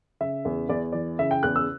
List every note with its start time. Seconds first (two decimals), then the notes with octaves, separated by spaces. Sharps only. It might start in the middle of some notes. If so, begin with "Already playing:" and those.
0.20 C#3 E5
0.45 E2
0.69 E2 D5
0.92 E3 D5
1.19 C#3 E5
1.31 G5
1.43 E2 F#6
1.56 E6